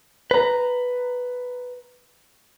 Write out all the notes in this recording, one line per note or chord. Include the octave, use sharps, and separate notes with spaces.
B4 A#5